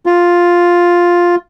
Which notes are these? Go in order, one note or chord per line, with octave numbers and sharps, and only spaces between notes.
F4